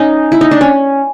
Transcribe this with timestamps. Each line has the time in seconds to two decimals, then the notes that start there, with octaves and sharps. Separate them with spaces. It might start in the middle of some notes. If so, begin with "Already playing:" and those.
Already playing: C#4 D#4
0.32 E4
0.41 D#4
0.51 D4
0.61 C#4